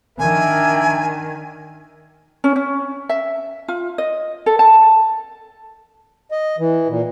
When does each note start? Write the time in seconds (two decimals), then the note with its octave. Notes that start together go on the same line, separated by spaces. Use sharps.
0.19 D#3 D4 A#4 E5 G#5
2.44 C#4
2.56 C#4
3.09 E5
3.68 F4
3.98 D#5
4.46 A4
4.59 A5
6.31 D#5
6.59 E3
6.88 A#2